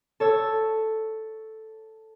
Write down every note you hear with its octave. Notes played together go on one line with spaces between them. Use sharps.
A4 C#5 E6